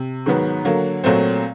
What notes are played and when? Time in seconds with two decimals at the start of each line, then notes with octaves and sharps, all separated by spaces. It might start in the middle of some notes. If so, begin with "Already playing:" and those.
Already playing: C3
0.26 G#2 D#3 F#3 B3
0.65 D3 F#3 A#3
1.04 A#2 F#3 A3 C4